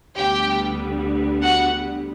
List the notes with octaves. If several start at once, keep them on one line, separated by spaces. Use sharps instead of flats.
D2 D3 G3 B3 G4 G5
F#4 F#5